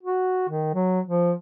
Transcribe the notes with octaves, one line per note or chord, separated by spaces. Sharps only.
F#4
D#3
F#3
F3